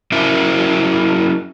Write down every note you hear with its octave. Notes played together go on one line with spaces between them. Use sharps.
F#3 C#4 E4 A#4 E5